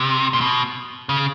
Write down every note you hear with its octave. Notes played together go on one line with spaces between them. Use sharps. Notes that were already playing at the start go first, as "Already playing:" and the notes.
Already playing: C3
A#2
B2
C#3